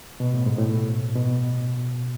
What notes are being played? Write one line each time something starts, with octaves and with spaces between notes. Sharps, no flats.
B2
A2
G#2
A2
B2